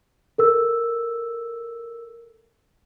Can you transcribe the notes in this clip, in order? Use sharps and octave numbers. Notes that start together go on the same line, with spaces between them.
A4 A#4 E6